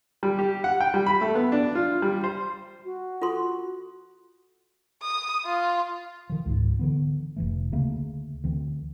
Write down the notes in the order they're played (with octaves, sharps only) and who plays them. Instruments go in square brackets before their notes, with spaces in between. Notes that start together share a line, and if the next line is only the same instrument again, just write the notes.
[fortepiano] G3
G4
F#5
G5
G3
B5
A3
B3
D4
F4
G3
C5
[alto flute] F#4
[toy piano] F4 A4 C6
[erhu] D#6
F4
[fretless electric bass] D#3 F3
C#2 G#2
D3 E3 B3
F1 E3 A3
D2 C#3 A3 A#3
D2 E3 C4